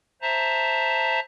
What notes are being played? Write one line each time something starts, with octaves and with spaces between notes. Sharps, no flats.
C5 E5 A5 A#5